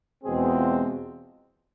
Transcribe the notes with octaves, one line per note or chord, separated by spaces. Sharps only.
E2 B2 G#3 C4 G#4
F4